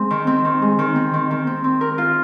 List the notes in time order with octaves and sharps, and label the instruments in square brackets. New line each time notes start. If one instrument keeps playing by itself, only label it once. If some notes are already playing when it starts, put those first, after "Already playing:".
Already playing: [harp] G#3 C4
D#3
C4
D#3
G#3
D#3
C4
D#3
D#3
C4
C4
A#4
F4